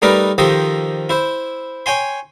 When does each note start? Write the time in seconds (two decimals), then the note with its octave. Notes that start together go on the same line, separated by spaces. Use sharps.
0.02 G3 A3 D#4 A#4 B4 D5
0.38 D#3 F3 G4 A4 C5 D#5
1.09 E4 C5
1.86 C#5 G5 G#5 C6